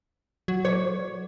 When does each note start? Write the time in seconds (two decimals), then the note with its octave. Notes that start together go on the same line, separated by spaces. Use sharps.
0.48 F#3
0.65 C#5